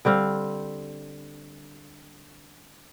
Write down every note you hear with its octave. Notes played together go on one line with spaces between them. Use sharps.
D3 G3 C4 F5